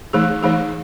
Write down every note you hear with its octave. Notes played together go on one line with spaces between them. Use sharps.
E3 A3 D#4 G#4
E3 A3 D#4 G#4